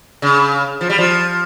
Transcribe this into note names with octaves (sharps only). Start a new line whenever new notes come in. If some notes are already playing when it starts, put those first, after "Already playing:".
C#3
F3
G3
F3